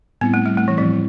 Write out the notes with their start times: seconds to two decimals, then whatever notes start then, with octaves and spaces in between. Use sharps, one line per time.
0.21 A2 G3 B3 C4 E4
0.34 A3
0.46 G3
0.57 A3
0.68 E3
0.77 A2 F3 G3 C4 E4